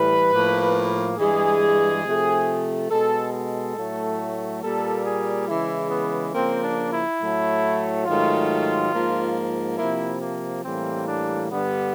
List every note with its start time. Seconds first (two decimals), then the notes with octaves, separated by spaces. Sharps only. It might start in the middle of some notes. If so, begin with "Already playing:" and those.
Already playing: A2 E3 G3 B4
0.31 A2 F3 A#3
1.17 G2 E3 G#3 G#4
2.04 C3 F3 A3
2.90 B2 G#3 A4
3.33 A4
3.75 A2 F#3 A3
4.62 A#2 G3 A#3 A4
5.04 G#4
5.47 C#3 E3 G#3 E4
5.91 B3
6.34 C#3 F3 A#3 C4
6.63 D4
6.92 E4
7.20 A2 F#3 A3
8.05 G#2 D#3 F#3 A3 F4
8.91 G#2 F3 A#3
9.78 C3 F3 A#3 E4
10.21 A#3
10.64 A2 E3 G3 A#3 C4
11.07 D4
11.50 G2 D3 G3 B3